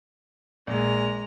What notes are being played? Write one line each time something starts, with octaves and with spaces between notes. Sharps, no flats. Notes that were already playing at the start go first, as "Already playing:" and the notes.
A#1 G#3 A#5